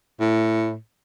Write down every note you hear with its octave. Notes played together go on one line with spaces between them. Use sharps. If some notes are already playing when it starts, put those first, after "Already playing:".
A2